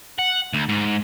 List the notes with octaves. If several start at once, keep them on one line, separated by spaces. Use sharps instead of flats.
F#5
D2
G#2